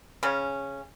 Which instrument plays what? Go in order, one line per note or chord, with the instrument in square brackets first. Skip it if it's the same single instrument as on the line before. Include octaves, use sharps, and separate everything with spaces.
[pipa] C#3 C#4